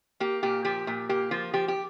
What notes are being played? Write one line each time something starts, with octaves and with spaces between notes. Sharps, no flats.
A#3 G4
A#2 G4
F3 G4
A#2
A#3 G4
F3 F4
F3 G4
G4